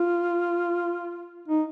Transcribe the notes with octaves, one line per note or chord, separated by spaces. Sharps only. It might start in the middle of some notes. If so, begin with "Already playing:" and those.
Already playing: F4
D#4